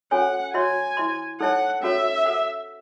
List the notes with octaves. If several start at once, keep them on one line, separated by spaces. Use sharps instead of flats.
C#4 F#4 A4 C#5 F#5 G#5
F#4 C#5 E5 G#5 C6
E4 C5 E5 C6
D#4 A4 C#5 E5 F#5 A5
C#4 F#4 A4 C#5 E5
A4 C5 F#5